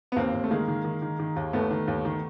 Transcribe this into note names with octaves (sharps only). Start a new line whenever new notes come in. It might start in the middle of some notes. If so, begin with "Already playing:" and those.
B3
D#2 A#3 C4
D#2
A3
D#3 G#3 A#3
D#3
D#3
D#3
D#3
D#2
D#2 A3 B3
D#3
D#2
D#3